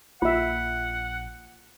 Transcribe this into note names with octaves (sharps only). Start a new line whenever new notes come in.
A#1 A#3 F4 E5 F#5